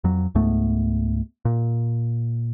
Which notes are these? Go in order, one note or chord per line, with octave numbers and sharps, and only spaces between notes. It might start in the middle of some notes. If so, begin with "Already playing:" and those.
F2 F#3
C#2 G#2 A3 B3
A#2